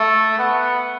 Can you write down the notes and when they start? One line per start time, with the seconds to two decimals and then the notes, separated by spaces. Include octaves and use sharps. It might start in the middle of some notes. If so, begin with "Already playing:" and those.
Already playing: A3
0.38 B3